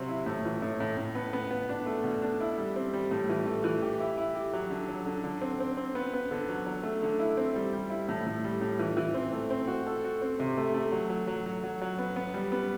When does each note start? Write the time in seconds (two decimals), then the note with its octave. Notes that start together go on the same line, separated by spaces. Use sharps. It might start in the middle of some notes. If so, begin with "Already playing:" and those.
Already playing: C3 F#3 C4
0.08 E4
0.26 A2
0.45 E3
0.62 A2
0.80 A2
0.97 A2
1.15 B3
1.33 B3
1.51 B3
1.69 D4
1.86 A3
2.04 B2
2.22 D4
2.40 E4
2.58 G3
2.76 C4
2.93 G3
3.11 A2
3.29 E3
3.46 A3
3.64 E3
3.82 G4
4.00 E4
4.17 E4
4.35 G4
4.53 F#3
4.70 D3
4.88 F#3
5.06 D3
5.24 D3
5.41 C4
5.60 C4
5.77 C4
5.95 B3
6.14 B3
6.31 D3
6.49 F#3
6.66 F#3
6.83 A3
7.02 D3
7.19 E4
7.37 C4
7.56 G3
7.73 G3
7.90 E4
8.09 A2
8.27 A2
8.44 G3
8.61 A2
8.79 E3
8.97 E3
9.14 C4
9.32 A3
9.50 C4
9.68 F#4
9.87 A4
10.04 F#4
10.22 C4
10.40 C3
10.57 A3
10.74 A3
10.92 F#3
11.10 F#3
11.27 F#3
11.46 F#3
11.64 F#3
11.81 F#3
11.99 B3
12.16 B3
12.34 G3
12.52 B3